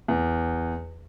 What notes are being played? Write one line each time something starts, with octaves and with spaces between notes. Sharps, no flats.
E2